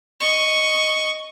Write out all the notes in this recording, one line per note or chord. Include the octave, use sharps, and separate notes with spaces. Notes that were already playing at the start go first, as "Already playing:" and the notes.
D#5 C#6